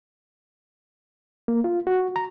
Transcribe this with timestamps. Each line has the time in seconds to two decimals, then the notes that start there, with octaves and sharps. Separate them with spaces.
1.48 A#3
1.64 F4
1.87 F#4
2.16 A#5